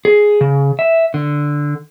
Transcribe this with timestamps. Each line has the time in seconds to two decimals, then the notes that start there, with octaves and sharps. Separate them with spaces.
0.05 G#4
0.41 C#3
0.79 E5
1.14 D3